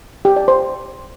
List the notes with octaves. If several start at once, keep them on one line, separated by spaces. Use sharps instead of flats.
G4
D5
C5